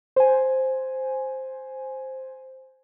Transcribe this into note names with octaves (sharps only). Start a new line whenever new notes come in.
C5 G#5